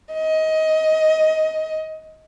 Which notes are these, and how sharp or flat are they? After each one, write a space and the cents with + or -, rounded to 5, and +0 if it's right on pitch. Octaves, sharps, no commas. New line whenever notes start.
D#5 +20